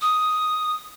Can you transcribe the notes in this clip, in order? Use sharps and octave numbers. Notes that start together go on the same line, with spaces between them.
D#6